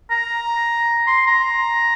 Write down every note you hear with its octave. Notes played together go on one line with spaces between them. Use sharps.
A#5
C6
A#5